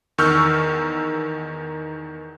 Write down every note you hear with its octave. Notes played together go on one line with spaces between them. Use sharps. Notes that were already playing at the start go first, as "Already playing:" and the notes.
E2 D#3 C#6 E6 F6 G6